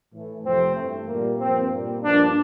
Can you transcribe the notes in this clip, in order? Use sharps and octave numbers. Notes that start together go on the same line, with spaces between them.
A2 E3 A3
F2 C3 F3 A3 C4
G2 E3 A3
A#2 G3 A#3
G2 F3 A#3 C4
A#2 G3 A#3
G2 F3 A#3 D4